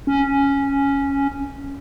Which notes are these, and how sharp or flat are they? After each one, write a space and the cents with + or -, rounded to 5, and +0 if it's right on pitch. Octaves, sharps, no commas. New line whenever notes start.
C#4 +0